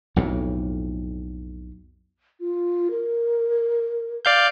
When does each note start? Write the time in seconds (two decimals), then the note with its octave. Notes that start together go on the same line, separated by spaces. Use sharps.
0.16 B1 F2 A2
2.40 F4
2.91 A#4
4.25 D5 F5 G6